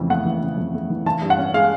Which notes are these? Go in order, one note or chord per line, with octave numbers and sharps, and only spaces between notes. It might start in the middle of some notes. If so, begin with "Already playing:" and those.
Already playing: F2 C#3 E3 A3
A3 F#5
E3
C#3
F2
A3
E3
E3 A5
G2
F#5
C#4
G#3 F5